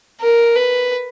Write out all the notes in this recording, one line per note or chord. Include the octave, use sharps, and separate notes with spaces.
A#4
B4